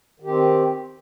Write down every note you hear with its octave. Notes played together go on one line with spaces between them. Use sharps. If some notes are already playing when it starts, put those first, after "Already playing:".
D#3 C4 G4